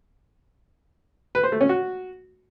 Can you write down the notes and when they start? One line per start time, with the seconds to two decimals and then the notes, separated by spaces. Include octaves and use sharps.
1.35 B4
1.43 C5
1.52 A3
1.61 C#4
1.69 F#4